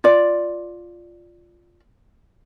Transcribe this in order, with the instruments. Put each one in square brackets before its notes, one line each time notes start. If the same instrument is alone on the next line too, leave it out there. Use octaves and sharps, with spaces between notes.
[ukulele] F4 D5